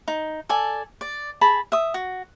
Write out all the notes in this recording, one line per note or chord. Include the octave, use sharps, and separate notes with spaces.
D#4
A4 D5 G#5
D5
G#4 A5 B5
E5 D#6
F#4